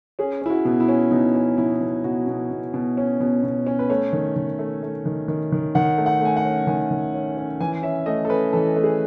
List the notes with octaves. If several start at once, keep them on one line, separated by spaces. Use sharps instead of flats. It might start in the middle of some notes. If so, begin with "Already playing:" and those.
C#4 G#4
C#4 E4
F#4
B2
E4
C#4
B2 D#4
C#4
B2 E4
B2
B2 F#4
B2
B2
B2
C#4
B2
B2
C#4
B4
A3 C#5
D#3
D#3
A3
A3
D#3
D#3
D#3
D#3 F#5
A3
F#5
A3 G#5
F#5
C#4
D#3 G#5
D#3
C#4
C#4
E3 G#5
C#4 E5
A3 D#5
A4
C#4 B4
E3 A4
A3
G#4